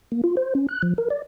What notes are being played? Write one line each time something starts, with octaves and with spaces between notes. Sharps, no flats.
A#3
F4
C5
C#4
F#6
F3
A#4
D5